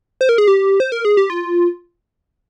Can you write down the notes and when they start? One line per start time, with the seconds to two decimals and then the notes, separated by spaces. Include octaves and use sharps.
0.21 C5
0.29 A#4
0.38 G#4
0.48 G4
0.80 C5
0.92 A#4
1.05 G#4
1.17 G4
1.30 F4